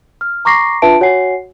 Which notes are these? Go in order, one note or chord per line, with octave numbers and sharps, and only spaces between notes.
F6
A#5 C#6 D6 A#6 C7
D4 F4 B4 E5 A5 D7
F#4 C#5 F#5 G#5 C7